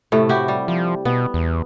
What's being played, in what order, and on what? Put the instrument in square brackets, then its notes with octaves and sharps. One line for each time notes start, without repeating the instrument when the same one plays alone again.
[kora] A2 C3 A3
E4 F#4 G4
G3
[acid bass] F3
[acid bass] B2 [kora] B3
[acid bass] E2